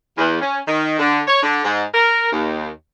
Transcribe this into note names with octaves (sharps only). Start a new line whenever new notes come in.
E2
C#4
D#3
D3
C#5
D3
G#2
A#4
D#2